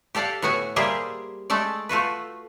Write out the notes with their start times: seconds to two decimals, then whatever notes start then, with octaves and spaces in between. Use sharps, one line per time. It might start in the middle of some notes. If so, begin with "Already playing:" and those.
0.15 G4 A4 D5 F5 F#5
0.42 A2 B3 F#4 F#5 G#5
0.76 G3 A#3 G4 G#4 C5 E5
1.50 G#3 A3 A4 D5
1.89 A3 F4 F#4 B4